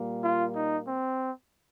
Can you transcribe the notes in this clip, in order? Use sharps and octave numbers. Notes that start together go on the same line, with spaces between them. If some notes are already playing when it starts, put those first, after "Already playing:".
Already playing: A#2 G3 A#3
F4
D#4
C4